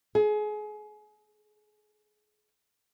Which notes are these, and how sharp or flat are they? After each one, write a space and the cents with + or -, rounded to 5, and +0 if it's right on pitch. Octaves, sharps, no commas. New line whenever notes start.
G#4 +30